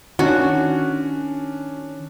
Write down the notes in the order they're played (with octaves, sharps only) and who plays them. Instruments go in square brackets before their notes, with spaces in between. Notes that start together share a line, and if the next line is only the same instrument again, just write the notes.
[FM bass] D#3 [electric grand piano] C#4 D4 [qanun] F#4